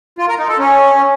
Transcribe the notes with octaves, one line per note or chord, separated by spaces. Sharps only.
F4
A#4
D#4
A4
C#4